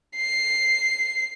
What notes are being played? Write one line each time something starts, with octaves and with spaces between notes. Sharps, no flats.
C7